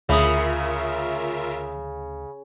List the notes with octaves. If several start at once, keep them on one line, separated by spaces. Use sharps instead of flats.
D2 C#3 E4 F4 A#4 E5 D#6